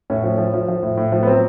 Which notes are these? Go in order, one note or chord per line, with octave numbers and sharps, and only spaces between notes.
A2 C#4
F3
F3
F3
F3
A2
A2
F3
B3
F#3 C4